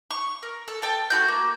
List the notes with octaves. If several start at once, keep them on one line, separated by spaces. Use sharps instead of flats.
C#6
A#4
A4
A4 G5 A5
A3 F4 F#4 G6
A#3